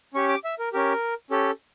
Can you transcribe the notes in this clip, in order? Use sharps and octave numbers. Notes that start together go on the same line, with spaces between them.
C#4 G4 C#6
D6
E5
A#4
C#4 G4 A#4
C#4 G4 A4